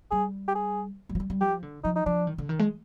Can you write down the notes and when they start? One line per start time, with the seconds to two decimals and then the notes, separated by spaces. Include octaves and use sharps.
0.11 G3 G#4
0.48 G4
0.55 G#4
1.09 G3
1.15 F3
1.20 G3
1.30 G3
1.41 F3 G4
1.63 D3
1.84 F3 D#4
1.96 D#4
2.06 F3 D4
2.27 D#3
2.38 D3
2.49 D#3
2.59 G#3